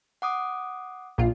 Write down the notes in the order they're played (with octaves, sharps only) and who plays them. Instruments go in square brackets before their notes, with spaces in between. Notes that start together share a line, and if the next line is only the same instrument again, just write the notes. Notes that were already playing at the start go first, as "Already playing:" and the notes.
[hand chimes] F#5 D6 D#6
[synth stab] A#1 A#2 F4